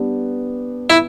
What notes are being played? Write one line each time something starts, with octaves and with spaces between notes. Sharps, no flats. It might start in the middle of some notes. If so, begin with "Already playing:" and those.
Already playing: G3 B3 D4 G4 B4
E4